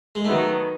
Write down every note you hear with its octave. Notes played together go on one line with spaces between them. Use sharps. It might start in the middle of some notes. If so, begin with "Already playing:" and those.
G#3
D#3 F#3 A3 B3 D#4